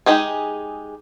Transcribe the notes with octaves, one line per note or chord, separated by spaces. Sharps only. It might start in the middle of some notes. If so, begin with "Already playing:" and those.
G#3 D#4 G4 G#4